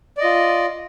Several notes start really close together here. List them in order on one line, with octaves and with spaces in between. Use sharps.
D5 D#5 F4